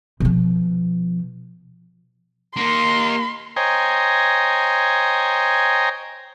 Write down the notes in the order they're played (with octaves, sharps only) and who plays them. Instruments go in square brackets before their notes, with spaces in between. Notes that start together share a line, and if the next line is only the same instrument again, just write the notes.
[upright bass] B2 F3
[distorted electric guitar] A#3 D#4 [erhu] C6
[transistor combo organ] C5 C#5 D#5 G5 G#5 A#5